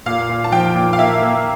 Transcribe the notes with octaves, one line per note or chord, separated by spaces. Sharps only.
A#2 F5
A#2
A5
F3 G5
A#2
F5
A#3 E5
A#3